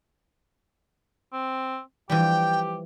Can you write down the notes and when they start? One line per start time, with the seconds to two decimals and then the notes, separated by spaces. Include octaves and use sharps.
1.33 C4
2.10 E3 F3 G3 G4 G5